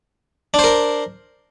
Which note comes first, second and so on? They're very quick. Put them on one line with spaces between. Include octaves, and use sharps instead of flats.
D4 C5 A#4